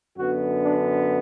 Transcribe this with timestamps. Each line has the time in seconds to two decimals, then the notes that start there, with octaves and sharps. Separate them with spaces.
0.17 F#2 D3 B3 F#4
0.63 D4